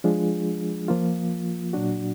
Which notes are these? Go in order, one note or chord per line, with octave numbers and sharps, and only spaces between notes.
F3 G#3 D4 F4 G#4
F3 A#3 F4
A#2 F#3 D4 F#4